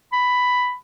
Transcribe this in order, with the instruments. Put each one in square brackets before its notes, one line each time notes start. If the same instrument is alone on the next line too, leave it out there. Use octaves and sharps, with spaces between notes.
[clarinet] B5